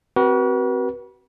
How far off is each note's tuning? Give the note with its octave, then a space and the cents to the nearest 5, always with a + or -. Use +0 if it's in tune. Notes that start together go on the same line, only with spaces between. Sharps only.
C4 +0 F#4 +35 B4 -40